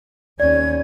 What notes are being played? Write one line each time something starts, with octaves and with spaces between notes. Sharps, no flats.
D#2 C#4 D5 G#6